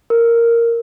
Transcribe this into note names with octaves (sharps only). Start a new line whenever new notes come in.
A#4